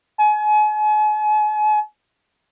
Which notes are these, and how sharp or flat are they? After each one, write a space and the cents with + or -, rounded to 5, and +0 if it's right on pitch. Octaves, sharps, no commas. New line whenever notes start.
G#5 +40